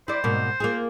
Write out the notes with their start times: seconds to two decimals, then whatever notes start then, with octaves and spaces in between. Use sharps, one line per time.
0.08 E4 C5 D5
0.24 G#2 B2 A#3
0.60 A#3 F4 G#4